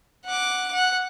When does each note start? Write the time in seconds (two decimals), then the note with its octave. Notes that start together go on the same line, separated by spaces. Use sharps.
0.25 F#5 D6
0.73 F#5